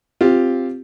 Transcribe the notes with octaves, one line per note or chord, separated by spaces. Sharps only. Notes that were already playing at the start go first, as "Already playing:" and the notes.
C4 F4 G4